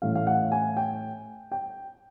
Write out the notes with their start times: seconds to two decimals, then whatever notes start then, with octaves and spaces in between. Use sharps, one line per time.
0.02 A2 E3 A3 C#4 F5
0.15 F5
0.27 F#5
0.52 G#5
0.77 G5
1.52 G5